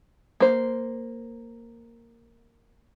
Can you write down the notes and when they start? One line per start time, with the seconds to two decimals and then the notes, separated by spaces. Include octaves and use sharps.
0.40 A#3 C5